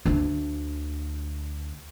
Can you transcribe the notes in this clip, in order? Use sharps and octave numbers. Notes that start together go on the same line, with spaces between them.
D2 D4